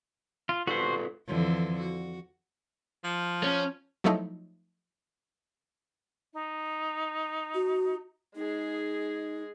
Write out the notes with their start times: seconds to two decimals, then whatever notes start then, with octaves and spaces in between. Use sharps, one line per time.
0.49 F4
0.67 F4 F#4 A4 B4 C5
1.27 F2 D3 E3
1.79 F#4
3.04 F3
3.44 C#4
4.04 F3 F#3 A3 D#4 E4
6.33 D#4
7.54 F#4
8.35 G#3 D#4 G#4